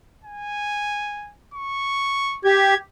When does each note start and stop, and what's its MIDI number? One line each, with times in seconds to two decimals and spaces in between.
0.24 1.33 80
1.54 2.39 85
2.45 2.74 67
2.45 2.77 92